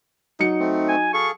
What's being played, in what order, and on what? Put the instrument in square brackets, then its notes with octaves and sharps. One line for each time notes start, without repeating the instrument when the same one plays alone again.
[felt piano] F#3 C#7 [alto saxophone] D#4
[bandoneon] A3 C4
[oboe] G#5
[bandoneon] G#4 A4 F5 [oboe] C#6